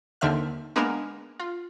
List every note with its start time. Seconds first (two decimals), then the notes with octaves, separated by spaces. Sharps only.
0.21 D#2 D3 C4 E5 F6
0.76 G#3 A#3 B3 D4 A#4
1.40 F4